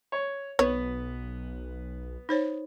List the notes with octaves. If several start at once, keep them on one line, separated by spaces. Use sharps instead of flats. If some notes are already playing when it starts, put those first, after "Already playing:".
C#5
B1 B3 B4 C#5
D#4 C5 C#5